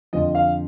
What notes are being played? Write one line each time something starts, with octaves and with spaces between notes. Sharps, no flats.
F2 D3 F3 D#5
F5